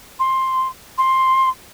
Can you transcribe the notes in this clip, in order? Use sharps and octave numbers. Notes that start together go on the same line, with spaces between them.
C6
C6